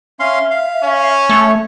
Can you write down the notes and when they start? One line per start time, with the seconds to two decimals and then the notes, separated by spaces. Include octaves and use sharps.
0.20 C#4 E5 F5 C6
0.50 F5
0.83 C#4
1.29 A3 C#5